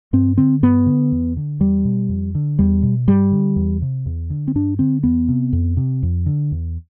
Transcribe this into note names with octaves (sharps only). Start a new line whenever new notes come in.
G2 C4
D3 C4
G2 B3
D3
E2
D3
E2 G3
B2
F2
D3
E2 G3
B2
G2 G3
D3
E2
C3
E2
D3
C4
G2 D4
D3 C4
E2 B3
C3
F2
C3
F2
D3
E2